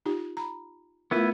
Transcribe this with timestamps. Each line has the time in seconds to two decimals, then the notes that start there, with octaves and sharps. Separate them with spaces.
0.06 D#4 F4 G4
0.37 A#5 B5
1.11 A3 B3 E4 F4 A#4 B4